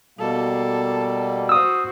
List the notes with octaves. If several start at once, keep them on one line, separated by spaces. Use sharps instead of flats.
B2 G3 A#3 A4
F#4 C5 D#6 E6